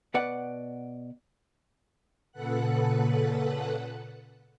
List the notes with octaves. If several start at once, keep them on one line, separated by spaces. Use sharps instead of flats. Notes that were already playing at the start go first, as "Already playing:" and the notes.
B2 B4 D5 F#5
A#2 C#3 A4 B4 F#5 F#6